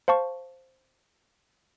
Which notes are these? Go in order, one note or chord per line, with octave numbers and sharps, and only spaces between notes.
C5 F5 A5 C#6